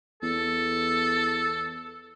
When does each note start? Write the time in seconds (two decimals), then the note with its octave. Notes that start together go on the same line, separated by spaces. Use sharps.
0.23 E2 A4